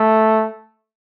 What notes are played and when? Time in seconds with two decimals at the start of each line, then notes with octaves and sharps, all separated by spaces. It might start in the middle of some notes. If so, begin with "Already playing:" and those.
Already playing: A3